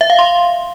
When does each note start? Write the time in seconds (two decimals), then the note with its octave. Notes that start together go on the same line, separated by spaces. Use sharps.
0.01 E5
0.10 F5
0.19 C6